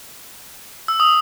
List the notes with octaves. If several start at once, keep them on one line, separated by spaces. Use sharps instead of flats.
E6
D#6